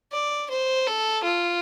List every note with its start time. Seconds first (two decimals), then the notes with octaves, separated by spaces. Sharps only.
0.12 D5
0.50 C5
0.87 A4
1.24 F4